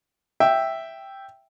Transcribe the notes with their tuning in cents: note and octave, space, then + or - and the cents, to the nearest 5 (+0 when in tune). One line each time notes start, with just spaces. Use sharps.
E5 +0 G5 +0